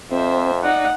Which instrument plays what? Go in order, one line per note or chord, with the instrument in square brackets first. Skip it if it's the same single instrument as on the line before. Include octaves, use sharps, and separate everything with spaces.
[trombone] F2 [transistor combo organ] C4 [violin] C5 E5
[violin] D#4 [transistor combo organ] D5 [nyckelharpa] F#5